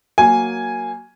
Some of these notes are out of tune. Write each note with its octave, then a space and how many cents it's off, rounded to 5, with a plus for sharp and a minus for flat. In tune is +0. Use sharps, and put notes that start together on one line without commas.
F#3 +0 A#3 +0 G#5 +0